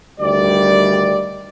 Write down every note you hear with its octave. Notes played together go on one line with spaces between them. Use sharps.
D2 D#3 G3 D5